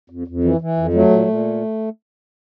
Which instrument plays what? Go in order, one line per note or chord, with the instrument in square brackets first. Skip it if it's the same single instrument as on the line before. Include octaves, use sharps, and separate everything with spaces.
[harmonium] F2
F2
E3
E3
F2
F#3 A3
A#2
A#2